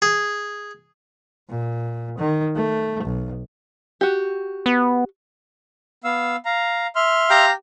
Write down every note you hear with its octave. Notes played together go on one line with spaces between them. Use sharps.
G#4
A#2
D#3
A3
B1
F#4 G4
B3
B3 F5 E6
F5 A#5
E5 C6 F6
G4 F5 A#5